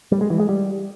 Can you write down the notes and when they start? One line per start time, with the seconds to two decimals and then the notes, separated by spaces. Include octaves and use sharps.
0.12 G3
0.21 G#3
0.30 E3
0.40 G#3
0.49 G3